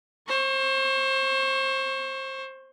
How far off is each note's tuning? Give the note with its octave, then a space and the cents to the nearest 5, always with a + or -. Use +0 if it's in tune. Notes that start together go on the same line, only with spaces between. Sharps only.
C5 +25 C#6 -15